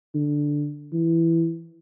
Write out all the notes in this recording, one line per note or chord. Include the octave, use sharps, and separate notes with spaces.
D3
E3